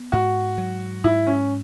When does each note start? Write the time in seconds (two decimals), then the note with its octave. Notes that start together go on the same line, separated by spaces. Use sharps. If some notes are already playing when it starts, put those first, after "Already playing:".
Already playing: B3
0.12 G#2 F#4
0.58 F#3
1.04 G#2 E4
1.27 C#4